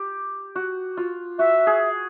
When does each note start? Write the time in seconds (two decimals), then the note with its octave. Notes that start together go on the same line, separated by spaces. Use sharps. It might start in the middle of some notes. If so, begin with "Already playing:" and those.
Already playing: G4
0.56 F#4
0.97 F4
1.39 F#4 E5
1.67 G#4